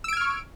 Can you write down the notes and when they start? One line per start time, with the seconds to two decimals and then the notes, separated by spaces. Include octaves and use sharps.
0.04 E6
0.08 D7
0.13 G#6
0.17 F6
0.21 C#6